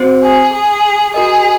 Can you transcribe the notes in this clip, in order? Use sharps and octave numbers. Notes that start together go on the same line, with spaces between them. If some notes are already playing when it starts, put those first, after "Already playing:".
Already playing: C4 F#4 C5
G#4
G#4
F#4 G#4 A#4 D#5